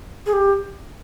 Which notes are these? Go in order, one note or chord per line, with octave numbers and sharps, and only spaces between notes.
G#4
G4